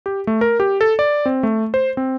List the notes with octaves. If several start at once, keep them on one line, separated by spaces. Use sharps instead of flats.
G4
A3
A#4
G4
A4
D5
C4
A3
C5
C4